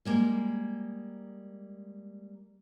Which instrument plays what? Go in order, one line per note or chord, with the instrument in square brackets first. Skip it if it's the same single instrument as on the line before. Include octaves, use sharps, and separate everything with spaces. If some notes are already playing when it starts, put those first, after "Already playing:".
[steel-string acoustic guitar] G3 G#3 A#3